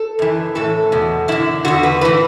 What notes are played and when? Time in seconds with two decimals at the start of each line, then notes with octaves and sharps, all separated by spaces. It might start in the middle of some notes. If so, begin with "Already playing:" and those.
Already playing: A4
0.19 F#2 E3
0.55 A2 E3 A4
0.92 E2 B2
1.28 F#2 D3 E4
1.65 E2 D3 F#4
1.83 B4
2.01 A2 E3 B4